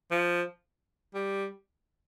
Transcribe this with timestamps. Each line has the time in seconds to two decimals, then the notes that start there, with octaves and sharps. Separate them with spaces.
0.11 F3
1.15 G3